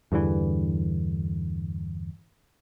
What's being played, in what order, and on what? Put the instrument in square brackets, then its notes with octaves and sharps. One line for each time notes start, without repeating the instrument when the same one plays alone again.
[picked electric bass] E2 G2 D3 E3